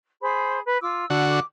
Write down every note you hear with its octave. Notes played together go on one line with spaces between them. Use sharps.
G#4 C5 B5
B4
F4 D6 E6
D3 F#4 A4 F#5
D6